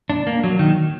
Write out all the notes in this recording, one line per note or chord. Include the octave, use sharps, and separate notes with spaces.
D4
A#3
F#3
D#3